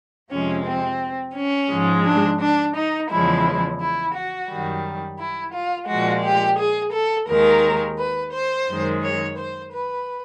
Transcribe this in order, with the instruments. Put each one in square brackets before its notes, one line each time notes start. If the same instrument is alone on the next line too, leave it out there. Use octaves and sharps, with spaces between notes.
[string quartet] F2 C3 F3 G#3 C#4
C4
C#4
G#2 F3 G#3
D4
D4
D#4
E2 C#3 F3 G#3 E4
E4
F#4
F#2 D#3 G3
E4
F4
A#2 F3 G#3 F#4
G4
G#4
A4
D#2 D#3 G#3 A#4
B4
C5
F#2 D#3 G#3
C#5
C5
B4